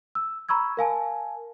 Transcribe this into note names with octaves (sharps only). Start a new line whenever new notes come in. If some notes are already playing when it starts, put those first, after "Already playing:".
E6
A#5 B5 C#6 E6 G#6
A#4 F5 G#5 A5